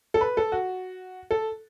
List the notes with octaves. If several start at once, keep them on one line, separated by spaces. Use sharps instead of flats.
A4
B4
A4
F#4
A4